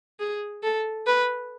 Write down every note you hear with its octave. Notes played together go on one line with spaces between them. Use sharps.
G#4
A4
B4